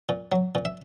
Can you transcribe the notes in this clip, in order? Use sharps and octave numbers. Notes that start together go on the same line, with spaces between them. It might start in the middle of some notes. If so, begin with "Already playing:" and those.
A#2
F#3
A#2
E5